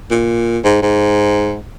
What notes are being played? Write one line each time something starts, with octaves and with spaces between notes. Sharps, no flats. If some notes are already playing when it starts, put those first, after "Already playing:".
A#2
G#2
G#2